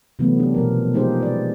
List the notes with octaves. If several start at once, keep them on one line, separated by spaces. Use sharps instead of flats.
C3 E3 F#3 A3 B3
D4 G4
B2 F3 A#4
G#3 D#4 F4 G4 G#4 C5
B4 D5